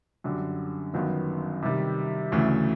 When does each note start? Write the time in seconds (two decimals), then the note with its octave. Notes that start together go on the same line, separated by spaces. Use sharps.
0.24 F#2 D3 G3
0.94 G1 F#2 D#3 F#3 B3
1.62 C3 D#3 G3
2.32 D2 C#3 E3 A3